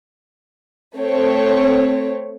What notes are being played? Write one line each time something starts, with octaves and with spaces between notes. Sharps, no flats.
A3 C4 C#5